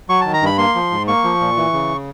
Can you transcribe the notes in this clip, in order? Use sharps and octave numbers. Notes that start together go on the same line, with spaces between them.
F#3 C#6
D#3 A5
A#5
G2 B5
A#3 C6
F3
G#2
A#3 C#6
F3
A#2
E3
C#3